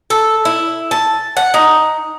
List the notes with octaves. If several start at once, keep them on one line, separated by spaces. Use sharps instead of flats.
A4
E4
A5
F#5
D#4